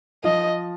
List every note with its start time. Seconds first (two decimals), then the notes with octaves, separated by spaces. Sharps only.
0.24 F3 D#5